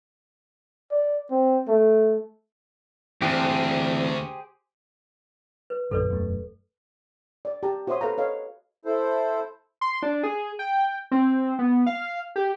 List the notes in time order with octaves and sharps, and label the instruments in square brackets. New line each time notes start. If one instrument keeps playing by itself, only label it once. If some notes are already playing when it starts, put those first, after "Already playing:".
[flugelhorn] D5
C4
A3
[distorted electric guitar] D2 [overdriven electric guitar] E3 C4 [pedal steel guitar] G4 G#4 C5
[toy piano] B4
[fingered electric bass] A#1 F#2 D3 [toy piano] A4 B4 D5
[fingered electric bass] E1 F#2 A3
[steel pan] D5
G4 A5 A#5
F#4 C5 C#5 E5 C6 D#6
A4 B4 F5 A#5
A4 B4 C#5 D#5 F5
[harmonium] E4 A4 C5
[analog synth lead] C6
D4
G#4
G5
C4
B3
F5
G4